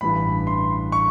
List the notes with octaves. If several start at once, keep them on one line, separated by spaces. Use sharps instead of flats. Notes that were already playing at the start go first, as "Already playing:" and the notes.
A1 G2 E3 B5
C6
C#6